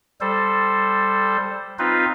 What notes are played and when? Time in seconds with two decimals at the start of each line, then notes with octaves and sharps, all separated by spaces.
0.21 G3 A4 C5
1.79 C4 D#4 F4 B4